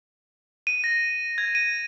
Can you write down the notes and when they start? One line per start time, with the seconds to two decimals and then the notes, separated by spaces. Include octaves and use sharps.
0.67 D#7
0.84 A#6
1.38 G#6
1.55 D#7